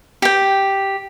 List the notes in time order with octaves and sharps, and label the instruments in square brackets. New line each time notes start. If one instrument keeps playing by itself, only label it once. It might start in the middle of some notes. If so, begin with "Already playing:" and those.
[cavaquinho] G4 G5